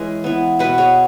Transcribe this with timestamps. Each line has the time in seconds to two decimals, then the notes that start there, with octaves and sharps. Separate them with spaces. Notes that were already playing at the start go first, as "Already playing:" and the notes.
Already playing: E3 G#3 C#4
0.24 E3 B3
0.59 B2 B3 F#4 B4
0.78 G#4 C#5